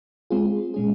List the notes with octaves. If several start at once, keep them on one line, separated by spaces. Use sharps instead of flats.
G#3 C4 F4 G#4
A#2 G#3 C#4 G#4